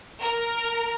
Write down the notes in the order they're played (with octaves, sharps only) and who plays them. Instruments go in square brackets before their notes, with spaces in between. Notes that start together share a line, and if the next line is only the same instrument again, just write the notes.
[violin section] A#4